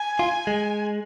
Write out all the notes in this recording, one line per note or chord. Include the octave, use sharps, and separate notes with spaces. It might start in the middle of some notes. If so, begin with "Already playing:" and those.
Already playing: G#5
F4
G#3